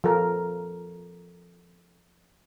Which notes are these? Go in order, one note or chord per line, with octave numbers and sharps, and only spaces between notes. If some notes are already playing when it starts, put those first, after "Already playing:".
F3 A4 A#4